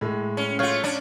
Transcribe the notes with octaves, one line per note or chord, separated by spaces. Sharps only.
A2 G#3
C#4
A3 F4 C#5 F5
C#4 D4